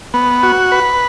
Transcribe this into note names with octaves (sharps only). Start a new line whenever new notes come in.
B3
F#4
B4